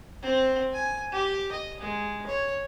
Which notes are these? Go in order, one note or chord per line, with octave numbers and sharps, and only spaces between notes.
C4
G#5
G4
D#5
G#3
C#5